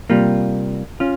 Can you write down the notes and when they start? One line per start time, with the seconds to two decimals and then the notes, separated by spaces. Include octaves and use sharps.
0.10 C3 G3 A#3 F4
1.00 C#4 F4